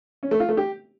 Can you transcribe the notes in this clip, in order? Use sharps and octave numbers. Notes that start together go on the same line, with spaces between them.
C#4
A3
F4
A3
G4